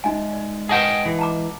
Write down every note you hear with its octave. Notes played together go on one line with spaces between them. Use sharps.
G#3 D#4 E5 G#5
D5
G#4 B4 D#5 F#5 G5 A5
E3
A5 A#5 D6